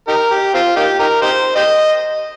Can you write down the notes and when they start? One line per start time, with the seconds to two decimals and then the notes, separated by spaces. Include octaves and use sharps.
0.08 D#4 G4 A#4
0.31 G4
0.54 C4 F4
0.76 A#3 D#4 G4
0.99 D#4 G4 A#4
1.22 D#4 G4 C5
1.56 G4 C5 D#5